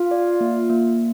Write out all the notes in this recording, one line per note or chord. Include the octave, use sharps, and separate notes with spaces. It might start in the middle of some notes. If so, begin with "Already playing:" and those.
Already playing: F4 F5
D5
A#3
A#3